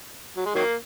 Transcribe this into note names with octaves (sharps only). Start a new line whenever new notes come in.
F#3
G#3
D#3 F#3 A#3